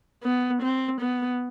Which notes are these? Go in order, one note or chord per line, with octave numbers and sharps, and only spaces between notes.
B3
C4
B3